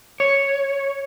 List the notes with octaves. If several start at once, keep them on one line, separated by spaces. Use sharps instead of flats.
C#5